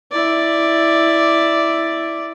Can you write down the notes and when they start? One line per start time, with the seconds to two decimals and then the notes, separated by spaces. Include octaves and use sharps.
0.11 E4 D5